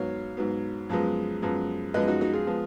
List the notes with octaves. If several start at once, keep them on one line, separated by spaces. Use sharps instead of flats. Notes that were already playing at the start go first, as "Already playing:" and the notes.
Already playing: G#2 F#3 B3 C#5 F5
G#2 F#3 B3
F#2 F3 G#3 B3
F#2 F3 G#3 B3
F#2 F3 G#3 B3 B4 D#5
D#4 F#4
D#4 F#4
F4 G#4
F3 G#3 B3